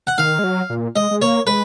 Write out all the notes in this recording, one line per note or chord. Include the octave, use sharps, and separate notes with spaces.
F#5
D#3 F5
G#3
F#3
A#2
G#3 D#5
G#3
A#3 C#5
G#3 B4